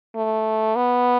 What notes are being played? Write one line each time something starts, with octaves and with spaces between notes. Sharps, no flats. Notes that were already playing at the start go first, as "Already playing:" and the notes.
A3
B3